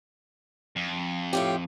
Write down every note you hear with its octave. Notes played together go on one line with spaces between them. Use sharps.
F2
A2 F4 G4